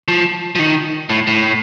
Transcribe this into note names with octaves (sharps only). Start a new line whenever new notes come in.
F3
F3
D#3
A2
A2